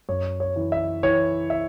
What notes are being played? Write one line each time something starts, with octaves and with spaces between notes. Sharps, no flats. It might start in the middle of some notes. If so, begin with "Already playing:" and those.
F#2 C#5
C#5
E3
E5
E3 C#5
E5